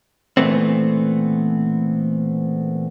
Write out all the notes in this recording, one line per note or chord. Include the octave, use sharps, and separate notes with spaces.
A#2 E3 A3 B3 C4